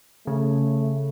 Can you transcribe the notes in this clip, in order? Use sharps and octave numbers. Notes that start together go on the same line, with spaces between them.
C#3 A3